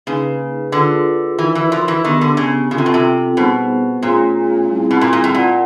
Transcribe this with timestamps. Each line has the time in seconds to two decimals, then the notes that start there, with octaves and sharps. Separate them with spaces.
0.07 C#3 A#3 D#4 G#4 B4
0.72 D3 F4 G#4 B4
1.38 E3 D#4 F#4 A#4
1.55 E3
1.72 F3
1.88 E3
2.05 D#3 B3 D4 G4
2.21 D3
2.37 C#3
2.71 C#3 C4 F4 A4
2.78 C3
2.86 B2
2.94 C3
3.36 B2 G3 B3 D#4 G#4 C5
4.02 A#2 A3 C#4 F4 G#4 C#5
4.68 G3 C4 E4 G#4
4.91 B2
5.01 A#2
5.13 A#2
5.24 A2
5.34 A#2 F4 A#4 D5 F#5